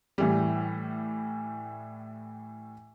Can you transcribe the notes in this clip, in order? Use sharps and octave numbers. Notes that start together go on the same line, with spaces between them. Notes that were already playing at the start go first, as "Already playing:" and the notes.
A2 E3 G3